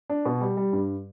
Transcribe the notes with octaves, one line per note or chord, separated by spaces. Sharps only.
D4
B2
G3
G3
G2